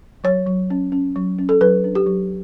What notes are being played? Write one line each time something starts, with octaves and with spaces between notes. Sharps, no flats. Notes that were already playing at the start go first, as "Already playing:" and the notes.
F#3 C#5
F#3
C#4
C#4
F#3
C#4
A4
F#3 B4
D4
G4
F#3